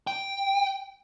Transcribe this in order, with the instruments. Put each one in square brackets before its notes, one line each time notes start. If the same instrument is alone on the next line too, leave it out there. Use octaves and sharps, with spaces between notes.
[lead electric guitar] G5